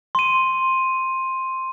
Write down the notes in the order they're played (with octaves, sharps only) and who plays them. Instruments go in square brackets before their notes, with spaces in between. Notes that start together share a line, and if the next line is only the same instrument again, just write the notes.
[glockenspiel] C6 D#7